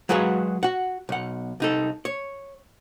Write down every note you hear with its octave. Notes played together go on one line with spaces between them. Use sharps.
F#3 G#3 F#4 G#4 B4 F5
F#4 F#5
B1 F#5
C2 D#4 A4
C#5